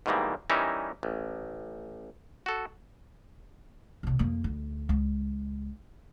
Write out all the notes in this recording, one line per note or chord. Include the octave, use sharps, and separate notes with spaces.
G#2 B2 D#3 E3 G3 A#3
E3 G3 C#4 D#4 A#4 E5
A1
F#4 A4
A#1 C3
F2 A#3
D2
C#2